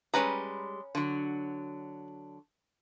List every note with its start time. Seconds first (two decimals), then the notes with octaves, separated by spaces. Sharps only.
0.14 G3 G#3 C#4 B4 A#5
0.95 D3 F#3